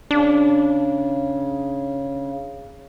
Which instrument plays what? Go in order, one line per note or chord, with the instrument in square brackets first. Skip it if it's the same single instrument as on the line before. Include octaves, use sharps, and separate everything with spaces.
[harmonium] C#3 [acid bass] D4